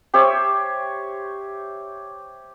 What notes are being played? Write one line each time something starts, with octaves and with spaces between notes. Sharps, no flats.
G4 C5 C#5 E5